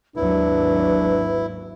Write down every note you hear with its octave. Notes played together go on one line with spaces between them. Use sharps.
G#1 D#2 F#3 D4 E4 B4